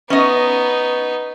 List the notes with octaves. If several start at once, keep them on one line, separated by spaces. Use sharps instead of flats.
B3 C#4 D#4 D#5